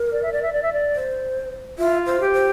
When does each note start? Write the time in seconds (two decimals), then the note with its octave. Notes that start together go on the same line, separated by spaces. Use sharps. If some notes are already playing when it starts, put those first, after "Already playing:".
Already playing: A#4
0.12 D5
0.22 E5
0.32 D5
0.42 E5
0.53 D5
0.63 E5
0.73 D5
0.95 C5
1.78 F4 E5
2.06 C5
2.20 G4
2.34 C5